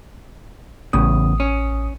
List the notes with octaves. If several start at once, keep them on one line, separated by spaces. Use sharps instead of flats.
A1 E2 A2 C#3 D#6
C#4